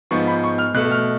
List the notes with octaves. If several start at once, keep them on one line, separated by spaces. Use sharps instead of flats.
G#2 F3 B3 C#6
B5
C#6
F6
B2 A3 F#6
F6